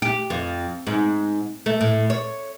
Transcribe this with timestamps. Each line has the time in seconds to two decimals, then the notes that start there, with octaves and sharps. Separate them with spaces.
0.02 G4
0.30 F2
0.87 G#2
1.66 A3
1.81 A2
2.10 C#5